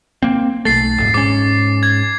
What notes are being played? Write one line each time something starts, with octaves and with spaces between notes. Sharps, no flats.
A#3 C4
B1 A3 A6 C7
D#1 G#1
G#2 C#4 D6 C7
G#6